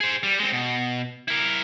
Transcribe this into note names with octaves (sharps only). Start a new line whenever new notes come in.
G#4 C5
G3
G#3 C4
B2
E4 A#4